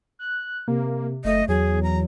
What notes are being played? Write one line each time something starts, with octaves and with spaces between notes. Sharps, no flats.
F#6
C3 A#3
F#1 A3 D#5
E2 F#3 G#4
A#5